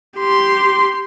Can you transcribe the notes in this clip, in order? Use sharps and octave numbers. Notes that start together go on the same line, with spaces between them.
G4 C6